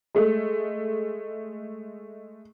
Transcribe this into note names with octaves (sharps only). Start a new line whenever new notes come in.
G#3 A3